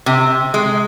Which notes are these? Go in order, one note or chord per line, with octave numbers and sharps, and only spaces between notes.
C3
G#3